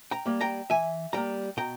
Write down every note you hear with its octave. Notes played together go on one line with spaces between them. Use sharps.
G5 A#5
G3 A#3
G5 A#5
E3 E5 G#5
G3 A#3 G5 A#5
B2 G5 A#5